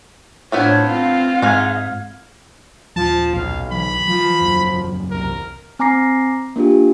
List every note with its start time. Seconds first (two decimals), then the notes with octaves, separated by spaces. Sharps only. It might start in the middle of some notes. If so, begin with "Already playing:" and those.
0.52 A2 F3 A3 B3 D4 C#5
0.87 C4 F4 F5
1.42 G#2 G#3 D#4 F6 G#6
2.96 D#1 F3 A5
3.33 B1 F5
3.72 E3 F#3 B5
4.08 F3
4.41 F#1 E2 F#3
5.11 C2 A#4
5.79 C4 G#5 A#5 D6 A#6 C7
6.56 A#3 D4 F4 G4